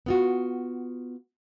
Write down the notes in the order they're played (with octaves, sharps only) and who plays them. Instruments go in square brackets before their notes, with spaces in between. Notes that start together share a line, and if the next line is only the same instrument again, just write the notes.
[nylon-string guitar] B3 F4 F#4